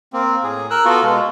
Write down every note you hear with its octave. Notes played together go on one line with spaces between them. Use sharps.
A#3 C4
A2 G#4
A#4 E6 F#6
B3 F4 F#4 A4
B2 G#3